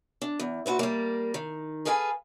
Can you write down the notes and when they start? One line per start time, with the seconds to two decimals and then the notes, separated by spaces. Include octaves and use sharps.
0.22 D4
0.39 E2
0.66 A#2 F#4 B4 E5
0.79 G3 A#3
1.34 D#3
1.85 G#4 A4 B4 F5 G5 G#5